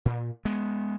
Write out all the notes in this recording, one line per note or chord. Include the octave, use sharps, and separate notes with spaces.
A#2
G#3 B3